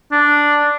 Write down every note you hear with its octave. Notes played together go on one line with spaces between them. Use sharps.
D4